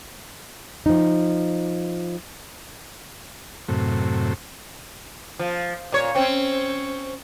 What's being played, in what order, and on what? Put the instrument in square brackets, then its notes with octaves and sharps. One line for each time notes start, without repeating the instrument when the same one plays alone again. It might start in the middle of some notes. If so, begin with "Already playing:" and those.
[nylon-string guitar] F3 D#4
[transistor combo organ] F#2 A2 C3
[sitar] F3
A#2 C#5
C4 C#4